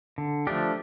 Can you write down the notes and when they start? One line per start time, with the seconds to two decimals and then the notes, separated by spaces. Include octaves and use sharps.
0.18 D3
0.47 F3 A3 D4 G4